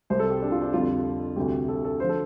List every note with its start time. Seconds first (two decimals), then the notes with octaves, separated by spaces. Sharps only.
0.10 C2 C3 G3 C5
0.20 A4
0.31 G4
0.42 D4
0.52 F4
0.62 D4
0.73 F2 D3 G3 F4
1.36 D2 C3 G3 G4
1.68 A4
1.84 A4
2.00 D3 F3 C5
2.09 A4